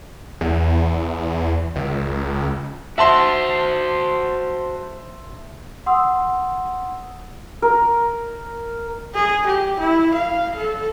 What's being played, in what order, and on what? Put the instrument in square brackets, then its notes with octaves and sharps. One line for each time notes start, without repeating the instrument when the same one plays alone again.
[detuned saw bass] E2
C#2
[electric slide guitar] F#4 C5 [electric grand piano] E5 A5 C6
[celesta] F#5 C6 D#6 E6
[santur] A#4
[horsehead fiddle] G#4
G4
E4
F5
A4